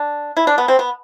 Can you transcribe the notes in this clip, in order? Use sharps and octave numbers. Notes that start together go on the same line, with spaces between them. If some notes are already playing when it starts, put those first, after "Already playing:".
Already playing: D4
E4
D4
B3
C4
B3